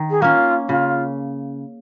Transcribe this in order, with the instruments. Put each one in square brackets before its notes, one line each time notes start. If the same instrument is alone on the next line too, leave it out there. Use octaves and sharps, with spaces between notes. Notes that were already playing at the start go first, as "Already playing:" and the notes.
Already playing: [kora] D#3
[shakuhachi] G#4
[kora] A#3 C#4 [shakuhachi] F4
[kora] C#3 [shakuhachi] F4